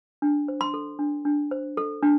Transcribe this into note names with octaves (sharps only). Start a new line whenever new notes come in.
D4
C5
C6
A4
D4
D4
C5
A4
D4